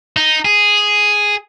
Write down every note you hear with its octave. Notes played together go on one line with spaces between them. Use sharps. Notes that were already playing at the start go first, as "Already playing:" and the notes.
D#4
G#4